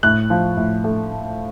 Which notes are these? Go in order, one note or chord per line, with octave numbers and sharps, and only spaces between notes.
A2 F#6
F3
A2
A3